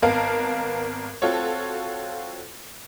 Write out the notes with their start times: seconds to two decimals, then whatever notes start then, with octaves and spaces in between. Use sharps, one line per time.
0.02 G#1 B3 A#4 F5 A5
1.22 C4 F4 F#4 A4 C#5